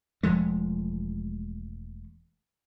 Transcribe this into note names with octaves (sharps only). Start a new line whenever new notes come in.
E1 F3 G#3 A3